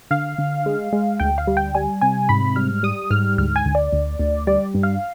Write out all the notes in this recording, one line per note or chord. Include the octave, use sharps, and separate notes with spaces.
D3 F5
D3
G#3
G#3
D2 G5
F5
G3
G5
G3 G#5
C3 G#5
G#2 B5
G3 F6
G3 D#6
G#2 F6
D2 F6
G#5
D2
D5
D2
D2
G3 D5
G2
F5